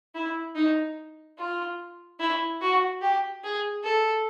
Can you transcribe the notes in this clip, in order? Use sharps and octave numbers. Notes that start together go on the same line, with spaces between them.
E4
D#4
F4
E4
F#4
G4
G#4
A4